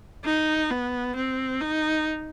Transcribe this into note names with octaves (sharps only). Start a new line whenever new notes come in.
D#4
B3
C4
D#4